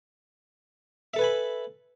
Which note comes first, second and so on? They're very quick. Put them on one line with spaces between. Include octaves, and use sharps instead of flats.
E5 A4 B4 G#5 B5